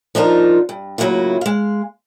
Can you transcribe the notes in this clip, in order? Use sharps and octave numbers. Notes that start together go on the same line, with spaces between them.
F3 D4 D#4 F4 A#4
G2
A2 C#3 F#3 A#3 E4 F4
G#3 F5